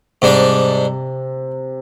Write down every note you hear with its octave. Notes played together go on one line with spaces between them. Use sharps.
G#2 C3 G3 D4